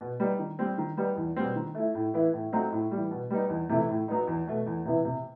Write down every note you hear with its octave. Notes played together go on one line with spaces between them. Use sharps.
B2
G3 B3 D#4
D#3
G3 C4
D#3
G3 B3 D#4
E2
B2 G3 C4
D#3
A3 E4
A2
E3 B3 E4
A2
F#3 A3 C4 D#4
A2
E3 G3
B2
G3 B3 D#4
E2
C3 E3 A3 E4
A2
F#3 B3 D#4
E2
B2 A3
E2
C3 E3 B3 E4
C3